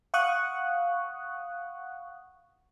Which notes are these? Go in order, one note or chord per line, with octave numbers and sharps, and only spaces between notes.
F5 F#5 C#6 D#6 F#6